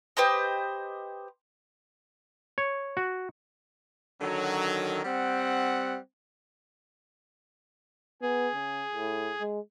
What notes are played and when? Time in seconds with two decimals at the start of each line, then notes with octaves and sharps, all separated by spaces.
0.17 G4 B4 C5 D#5
2.58 C#5
2.97 F#4
4.21 D3 D#3 F#3
5.05 G3 C4 F#5
8.22 B3 G#4
8.55 C#3
8.94 A2
9.41 G#3